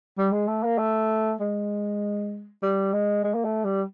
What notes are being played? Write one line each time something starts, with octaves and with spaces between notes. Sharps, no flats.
G3
G#3
A3
A#3
A3
G#3
G3
G#3
G#3
A#3
A3
G3